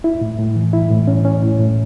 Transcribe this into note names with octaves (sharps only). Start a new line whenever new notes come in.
E4
A2
A2
E3
E4
A2
C#4
C#4
A2
A2